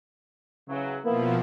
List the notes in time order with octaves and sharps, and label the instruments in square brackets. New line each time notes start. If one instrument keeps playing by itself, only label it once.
[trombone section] C#3 [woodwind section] E3 F#3
[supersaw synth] B2 F3 [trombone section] A#3 [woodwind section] B3 E4